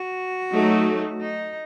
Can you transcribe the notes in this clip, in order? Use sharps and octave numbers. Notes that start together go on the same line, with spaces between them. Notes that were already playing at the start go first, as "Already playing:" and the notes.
Already playing: F#4
F#3 A3 D#4
D#4